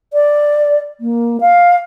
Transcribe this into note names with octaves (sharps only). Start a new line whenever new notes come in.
D5
A#3
F5